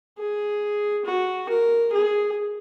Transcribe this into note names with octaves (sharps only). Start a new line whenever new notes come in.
G#4
F#4
A#4
G#4